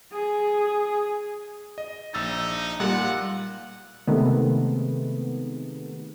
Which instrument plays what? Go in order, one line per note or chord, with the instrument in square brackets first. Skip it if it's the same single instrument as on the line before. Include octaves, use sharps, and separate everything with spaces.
[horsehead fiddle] G#4
[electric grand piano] D#5
[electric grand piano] A#1 E6 A6 [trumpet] D#4
[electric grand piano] A#2 F4 [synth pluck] G3 E7 [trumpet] F#5
[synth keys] C3 D#3 G#3 A3 B3